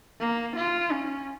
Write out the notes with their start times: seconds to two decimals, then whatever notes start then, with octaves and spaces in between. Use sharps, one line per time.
0.20 A#3
0.56 F4
0.91 C#4